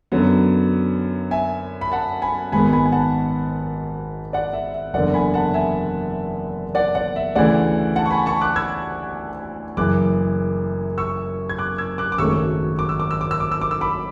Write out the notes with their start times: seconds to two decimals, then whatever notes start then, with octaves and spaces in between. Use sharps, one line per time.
0.12 F#2 D3 F#3 B3
1.31 E5 G#5
1.81 B5
1.92 F#5 A5
2.22 G#5 B5
2.52 G#1 G#2 G#3 B3 G#5 B5
2.73 G#5 B5
2.86 G#5
2.92 F#5 A5
4.33 D5 F#5
4.53 E5
4.74 E5
4.94 F#1 E2 D3 D5 F#5
5.14 G#5 B5
5.34 F#5 A5
5.54 E5 G#5
6.75 D5 F#5
6.95 D5 F#5
7.16 E5
7.35 D2 C#3 E3 A3 D5 F#5
7.96 F#5 A5
8.06 C#6
8.11 G#5 B5
8.26 A5 C#6
8.41 D6 F#6
8.56 E6 G#6
9.77 F#1 F#2 C#3 E3 D6 F#6
10.98 C#6 E6
11.49 G#6
11.58 D6 F#6
11.78 E6 G#6
11.98 D6 F#6
12.12 D6
12.18 G#1 F#2 C#3 F#3 A3 C#6 E6
12.79 D6
12.89 E6
13.00 D6
13.11 E6
13.21 D6
13.31 E6
13.40 D6
13.52 E6
13.61 D6
13.71 E6
13.81 B5 D6